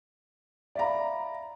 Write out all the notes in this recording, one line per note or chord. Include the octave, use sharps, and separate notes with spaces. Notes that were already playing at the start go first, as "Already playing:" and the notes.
D5 E5 F5 A#5 B5